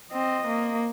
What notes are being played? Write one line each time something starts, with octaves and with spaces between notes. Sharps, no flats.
C4 D#5
A#3